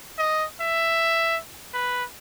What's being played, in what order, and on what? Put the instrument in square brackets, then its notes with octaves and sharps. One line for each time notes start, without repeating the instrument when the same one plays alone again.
[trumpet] D#5
E5
B4